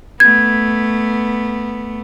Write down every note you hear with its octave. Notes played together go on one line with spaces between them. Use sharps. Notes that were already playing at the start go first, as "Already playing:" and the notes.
A3 B3 G#6